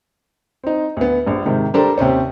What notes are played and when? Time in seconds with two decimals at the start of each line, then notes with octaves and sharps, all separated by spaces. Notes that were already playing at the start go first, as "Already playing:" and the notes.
0.64 C4 D#4
0.97 D2 B3
1.27 A#1 G2
1.46 G#2 C3 D#3
1.74 G3 D4 G4 A4 A#4 C5
1.98 D#2 C3 C4 C#4